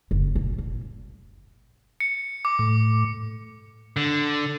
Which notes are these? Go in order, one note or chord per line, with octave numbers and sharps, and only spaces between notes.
F#1
A#2
A#2
C#7
D6
A2
D3